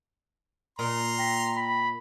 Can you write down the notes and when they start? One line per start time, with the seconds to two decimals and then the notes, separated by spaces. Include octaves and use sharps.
0.79 A#2 A#5 C6 F6
1.18 G5 A#6 B6
1.57 B5